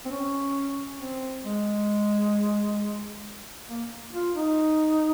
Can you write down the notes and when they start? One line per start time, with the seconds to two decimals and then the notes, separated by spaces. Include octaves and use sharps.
0.05 C4
0.11 C#4
1.00 C4
1.45 G#3
3.68 A#3
4.13 F4
4.35 D#4